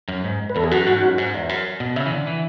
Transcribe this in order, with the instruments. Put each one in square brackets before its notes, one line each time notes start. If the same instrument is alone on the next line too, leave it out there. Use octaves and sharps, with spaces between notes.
[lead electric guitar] F#2
G#2
[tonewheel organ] B4
[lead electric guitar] E2 [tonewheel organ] A4
[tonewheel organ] G#4
[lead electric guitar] F#2 [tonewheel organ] F#4
[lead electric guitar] G#2
F#2
G#2
E2
F#2
B2
[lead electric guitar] C#3 [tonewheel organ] E5
[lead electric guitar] E3
D3
E3